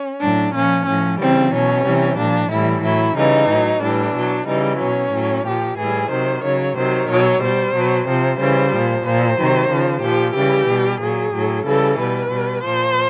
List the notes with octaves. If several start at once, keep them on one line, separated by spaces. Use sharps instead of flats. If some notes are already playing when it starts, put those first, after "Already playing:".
Already playing: C#4
A2 F#3 D4
A#2 F3 C#4
A2 F3 C#4
C#3 E3 G3 C4
B2 F#3 C#4
C3 E3 G3
A#2 F3 D4
A2 E3 G3 E4
A2 F#3 E4
C#3 E3 G3 D#4
A2 F#3
A2 E3 G3 D4
B2 F#3
C#3 E3 G3 D#4
B2 F#3 C#4
A2 F#3
A#2 F3 G4
A2 E3 G3 G#4
C3 D#3 F#3 C5
C#3 F#3 C#5
C3 D#3 F#3 C5
B2 F#3 C#5
B2 G3 C5
B2 F#3
C3 F3 C5
C#3 E3 G3 C5
A#2 F3
A#2 F3 C5
C3 D#3 F#3
C#3 F3
A#2 F3 G4
C#3 E3 G3 G4
B2 G3
A#2 F#3 G#4
A2 F#3
C#3 E3 G3 A4
B2 G3 B4
B2 G3
A#2 F3 C5